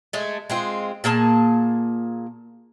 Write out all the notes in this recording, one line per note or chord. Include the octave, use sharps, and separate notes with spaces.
G#3 A3
G#3 C4 F4
A#2 A#3 G#4 A5